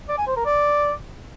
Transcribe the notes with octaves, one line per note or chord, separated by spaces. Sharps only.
D5
G#5
C5
A#4
D5